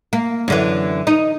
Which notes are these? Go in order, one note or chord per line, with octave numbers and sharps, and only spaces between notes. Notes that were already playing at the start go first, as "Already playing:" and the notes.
A#3
F#2 D3 E3
D#4